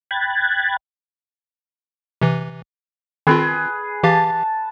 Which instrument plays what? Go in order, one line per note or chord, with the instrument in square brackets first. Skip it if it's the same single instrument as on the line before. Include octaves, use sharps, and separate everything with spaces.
[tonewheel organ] G5 B5 F#6 G#6 A6
[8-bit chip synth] C3 E3
[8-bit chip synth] D#3 C4 F4 [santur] G#4 B4
[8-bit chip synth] E3 G4 F5 [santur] A5